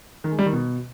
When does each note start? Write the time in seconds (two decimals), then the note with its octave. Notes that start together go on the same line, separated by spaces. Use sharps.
0.24 D#3
0.31 G#3
0.39 G3
0.46 D#3
0.53 B2